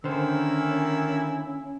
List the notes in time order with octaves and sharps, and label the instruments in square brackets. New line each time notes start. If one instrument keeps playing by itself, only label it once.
[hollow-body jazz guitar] D3 C5 [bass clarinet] D#3 [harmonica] A#3 E4 E6 [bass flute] C#4